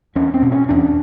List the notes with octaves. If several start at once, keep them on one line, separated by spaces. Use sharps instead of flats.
E2 C#4
C4
B2
C#4
E2 D4